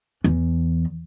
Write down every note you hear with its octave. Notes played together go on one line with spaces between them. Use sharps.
E2